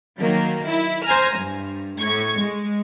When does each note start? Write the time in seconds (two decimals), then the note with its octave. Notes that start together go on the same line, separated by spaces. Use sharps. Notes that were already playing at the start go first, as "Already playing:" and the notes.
0.20 D#3 F#3 A#3
0.68 E4
1.04 C5 G#5 A#5 F6
1.36 G2
2.00 A2 C#6 G#6
2.37 G#3